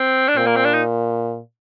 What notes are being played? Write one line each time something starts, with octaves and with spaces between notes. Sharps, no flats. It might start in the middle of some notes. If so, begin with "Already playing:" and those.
Already playing: C4
D4
A#2 C4
A#3
C4
D4
D#4